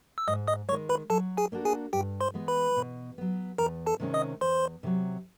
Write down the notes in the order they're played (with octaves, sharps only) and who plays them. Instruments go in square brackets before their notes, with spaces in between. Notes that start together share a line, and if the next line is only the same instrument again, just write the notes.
[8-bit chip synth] E6
[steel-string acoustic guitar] G#2 [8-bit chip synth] D#5 D#6
[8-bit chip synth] D#5 D#6
[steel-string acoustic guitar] D#3 G#3 [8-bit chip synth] C#5 C#6
[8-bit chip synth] B4 B5
[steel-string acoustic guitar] F#3 [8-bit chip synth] A4 A5
[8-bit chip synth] G#4 G#5
[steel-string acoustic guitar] A#3 D4 F#4 A4
[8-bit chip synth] G#4 G#5
[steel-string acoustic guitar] G2 [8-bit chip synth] G4 G5
[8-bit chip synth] C5 C6
[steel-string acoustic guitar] E3 G#3 B3
[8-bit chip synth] B4 B5
[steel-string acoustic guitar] B2
F#3 B3
[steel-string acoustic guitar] E2 [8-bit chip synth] A#4 A#5
[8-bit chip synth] A4 A5
[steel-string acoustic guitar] C3 D#3 G#3 C#4
[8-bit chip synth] D#5 D#6
[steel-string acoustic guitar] E2 [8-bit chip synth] C5 C6
[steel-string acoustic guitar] C3 D#3 F#3